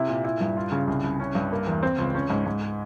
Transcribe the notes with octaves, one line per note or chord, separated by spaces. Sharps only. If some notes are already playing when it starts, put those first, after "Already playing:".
Already playing: C3 E4
A#2
E4
G2
F4
C#3
C2
C2
C#4
G2
A#3
E2
C4
C#2
C#4
G#2
G#2